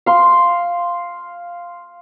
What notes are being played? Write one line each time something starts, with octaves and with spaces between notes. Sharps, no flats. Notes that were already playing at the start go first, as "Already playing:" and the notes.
F5 C6